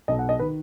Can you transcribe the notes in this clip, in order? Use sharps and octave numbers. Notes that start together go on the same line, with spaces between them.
B1 B2 D#5
F#5
D#5
D#3 B4